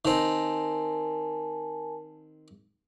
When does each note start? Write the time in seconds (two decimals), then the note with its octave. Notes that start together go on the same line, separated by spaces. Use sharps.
0.05 D#3 C4 A#4 G#5 A5